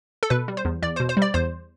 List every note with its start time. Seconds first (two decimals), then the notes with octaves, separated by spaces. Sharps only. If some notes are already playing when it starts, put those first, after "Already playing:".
0.23 A4
0.30 B2 B4
0.48 G3
0.57 C5
0.65 E2
0.82 E2 D5
0.96 B2 C5
1.09 C5
1.17 G3
1.22 D5
1.34 E2 C5